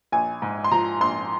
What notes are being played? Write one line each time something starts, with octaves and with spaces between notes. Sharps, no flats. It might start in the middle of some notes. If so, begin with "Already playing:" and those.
A#1 G#5
G#2
C6
F3 A#5
A#1 C6